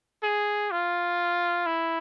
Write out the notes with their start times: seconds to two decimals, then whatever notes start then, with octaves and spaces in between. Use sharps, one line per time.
0.23 G#4
0.71 F4
1.66 E4